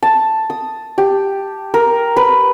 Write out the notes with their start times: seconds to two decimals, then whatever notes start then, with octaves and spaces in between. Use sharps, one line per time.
0.03 A5
0.50 D#6
0.98 G4
1.74 A#4
2.17 B4